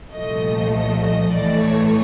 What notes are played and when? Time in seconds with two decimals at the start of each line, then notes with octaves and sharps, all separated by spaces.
0.12 C2 A#2 F3 A3 D#5
0.72 D#5
1.02 D#5
1.31 A2 E3 A3 D5
1.62 C#5